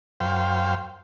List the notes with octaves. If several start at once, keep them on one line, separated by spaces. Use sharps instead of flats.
F#2 C5 F5 G5